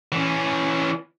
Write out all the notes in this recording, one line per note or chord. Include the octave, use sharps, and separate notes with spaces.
E3 C#4